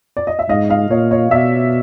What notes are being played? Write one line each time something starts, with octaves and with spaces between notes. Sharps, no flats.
D5
D#5
E5
G#2 D#5 F5
D#5 F5
A#2 C#5 D#5
C#5 D#5
B2 D5 E5